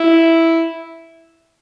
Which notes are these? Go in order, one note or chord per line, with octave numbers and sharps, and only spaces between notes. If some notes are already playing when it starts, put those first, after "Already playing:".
Already playing: E4